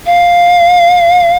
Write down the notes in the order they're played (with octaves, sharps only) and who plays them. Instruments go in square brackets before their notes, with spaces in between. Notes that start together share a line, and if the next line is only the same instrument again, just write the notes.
[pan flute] F5